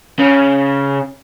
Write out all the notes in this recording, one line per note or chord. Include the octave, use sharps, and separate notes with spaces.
C#3